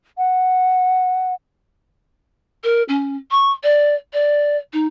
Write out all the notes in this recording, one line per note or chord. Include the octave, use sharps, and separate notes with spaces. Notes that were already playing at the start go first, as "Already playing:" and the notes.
F#5
A#4
C#4
C#6
D5
D5
D#4